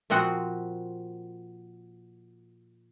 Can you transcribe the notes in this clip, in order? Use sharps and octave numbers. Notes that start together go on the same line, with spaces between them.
A#2 F3 C4 F#4 F#5